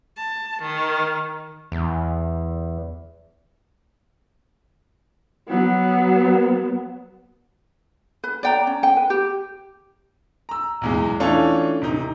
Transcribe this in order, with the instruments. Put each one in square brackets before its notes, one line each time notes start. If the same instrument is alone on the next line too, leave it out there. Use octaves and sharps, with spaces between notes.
[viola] A5
D#3
[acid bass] E2
[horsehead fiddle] F#3 B3
[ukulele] B4
D5 G5 A#5
C#4
G5
B4
G4
[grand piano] A#5 E6
B1 E2 G#3
E3 A3 C#4 D4 F4 A4
E1 C3 D#4